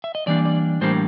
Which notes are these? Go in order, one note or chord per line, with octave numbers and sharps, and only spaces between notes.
E5
D#5
A2 E3 G3 A#3 D4 D5
D5
A2 E3 G3 A#3 D4 C5